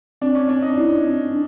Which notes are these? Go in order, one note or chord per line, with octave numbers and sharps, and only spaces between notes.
C4 D4
C#4
C4 D4
D#4
E4
C4
D4